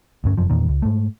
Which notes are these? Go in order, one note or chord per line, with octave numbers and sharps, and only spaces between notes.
D2 G2 C#4
F1 F#2 F3
E2 A#2 D#3
C#2
G#2 A3